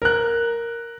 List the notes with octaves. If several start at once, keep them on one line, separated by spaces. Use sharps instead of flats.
A#4 F#6